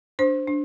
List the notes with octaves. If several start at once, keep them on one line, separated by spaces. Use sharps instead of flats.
D4 C5
D4